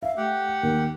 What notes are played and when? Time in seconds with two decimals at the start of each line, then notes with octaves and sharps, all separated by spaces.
0.03 E5 F5
0.17 A3 G4 F#5
0.63 D#2 A#4